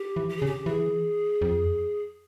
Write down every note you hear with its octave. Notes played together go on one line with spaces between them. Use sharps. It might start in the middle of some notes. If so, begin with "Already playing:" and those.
Already playing: G4
E3
G4
G#4
C#3
G4
E3 G#4
F2